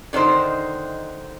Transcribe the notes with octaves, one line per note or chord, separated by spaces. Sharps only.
D3 D#3 D#4 C5